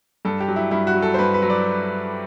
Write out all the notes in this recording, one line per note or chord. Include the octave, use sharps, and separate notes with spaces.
G2 A4
G4
F#3
E4
G2 E4
F#4
F#3
A4
C5
G2 B4
B4
F#3
D5